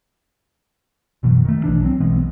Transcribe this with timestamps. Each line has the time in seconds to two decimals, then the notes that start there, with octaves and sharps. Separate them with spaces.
1.23 F#1 B2 E3 F#3
1.45 D#3 A3
1.64 B1 E3 D4
1.82 F#3 G3 C4
2.00 B1 E3 G#3 B3